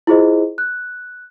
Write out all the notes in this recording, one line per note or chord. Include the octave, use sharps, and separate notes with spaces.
E4 F4 G#4 C5 D#5
F#6